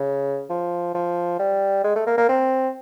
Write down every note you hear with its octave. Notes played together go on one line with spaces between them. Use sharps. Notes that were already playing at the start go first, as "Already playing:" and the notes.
Already playing: C#3
F3
F3
G3
G#3
A3
A#3
A#3
C4